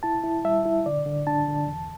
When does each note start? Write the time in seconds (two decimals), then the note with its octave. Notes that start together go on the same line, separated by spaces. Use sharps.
0.03 E4 A5
0.24 E4
0.44 G3 E5
0.66 E4
0.86 D3 D5
1.06 D3
1.27 D4 A5
1.48 D3
1.68 E2